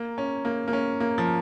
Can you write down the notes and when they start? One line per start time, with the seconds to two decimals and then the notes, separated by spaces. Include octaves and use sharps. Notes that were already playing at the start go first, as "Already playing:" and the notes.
Already playing: A#3
0.18 C#4
0.45 A#3
0.68 A#3
0.73 C#4
1.00 A#3
1.18 F3